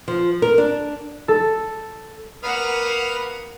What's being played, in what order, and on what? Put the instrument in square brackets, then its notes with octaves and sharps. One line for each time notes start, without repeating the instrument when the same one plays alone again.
[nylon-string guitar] F3
A#4
D4
[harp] A4
[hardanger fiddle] A#3 F#5 [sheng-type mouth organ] B4 D#6 F6